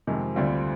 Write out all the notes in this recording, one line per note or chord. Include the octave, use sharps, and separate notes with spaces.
F2 C3 D#3 G#3
D2 D3 G3 C4 F4